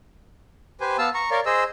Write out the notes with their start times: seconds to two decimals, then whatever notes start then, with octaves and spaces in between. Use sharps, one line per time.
0.81 G4 B4 C5 G#5
0.98 B3 F5 A5 E6
1.14 A#5 C#6
1.31 A#4 C#5 D5 F5
1.46 G#4 C5 D#5 E6